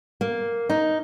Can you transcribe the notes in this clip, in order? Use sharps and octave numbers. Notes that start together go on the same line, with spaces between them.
A#3
D#4